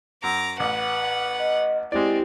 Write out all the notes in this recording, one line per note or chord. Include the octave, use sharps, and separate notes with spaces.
F#2 A#5 D6
A1 B4 F#5
D#5
G#3 C4 E4 G4 D5